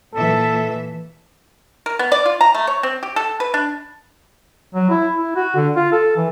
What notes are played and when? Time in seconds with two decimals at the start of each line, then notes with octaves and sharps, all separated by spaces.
0.14 A#2 E3 A4 E5
1.86 A#4
1.99 B3
2.12 D5
2.26 F4
2.41 A#5
2.54 A3
2.67 C#5
2.83 C4
3.03 G4
3.16 A4
3.40 B4
3.54 D4
4.74 F#3
4.89 E4
5.16 E4
5.36 F#4
5.56 D3
5.76 F4
5.92 A4
6.16 E3